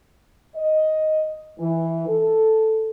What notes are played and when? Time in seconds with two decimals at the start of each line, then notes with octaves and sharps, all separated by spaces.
0.56 D#5
1.59 E3
2.08 A4